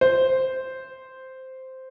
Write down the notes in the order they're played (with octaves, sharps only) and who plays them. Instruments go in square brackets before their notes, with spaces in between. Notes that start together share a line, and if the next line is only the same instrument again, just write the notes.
[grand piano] C5